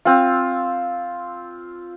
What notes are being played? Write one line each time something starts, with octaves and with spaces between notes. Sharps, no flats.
C4 F4